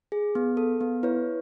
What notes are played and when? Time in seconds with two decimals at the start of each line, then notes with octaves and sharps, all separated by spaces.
0.12 G#4
0.35 B3
0.57 A4
0.81 B3
1.03 E4 B4 C#5